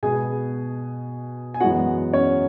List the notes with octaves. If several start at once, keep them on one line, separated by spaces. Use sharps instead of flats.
B2 G#3 B3 G#4 G#5
G#5
F#2 E3 G#3 B3 F#4 F#5
C#4 C#5